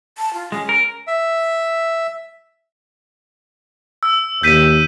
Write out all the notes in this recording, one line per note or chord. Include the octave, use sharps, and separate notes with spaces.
A5
F4
G#3 C#4
A#4
E5
E6
D#2 G6 B6 D#7